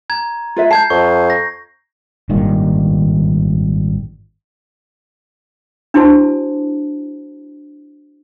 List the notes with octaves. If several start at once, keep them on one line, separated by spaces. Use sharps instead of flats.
A#5 G#6
F4 B4 E5
A5 G6 G#6 C7
F2 C#6
A#6
G#1 G2 A#2 D#3
D4 E4 F#4 C5 A5